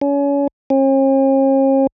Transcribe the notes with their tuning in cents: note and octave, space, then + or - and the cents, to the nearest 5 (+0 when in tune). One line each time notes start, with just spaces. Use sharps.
C#4 +30
C#4 -45